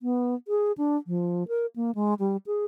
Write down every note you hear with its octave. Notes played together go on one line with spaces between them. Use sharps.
B3
G#4
D4
F3
A#4
A#3
G#3
G3
G#4